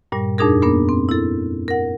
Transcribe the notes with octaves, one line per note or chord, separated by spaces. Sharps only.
G2 A#2 G3
F2 A#2 D4 D#4 G#4 A#4
A#3 B3 D4 A#4
C4
E4 A4
A#4 F#5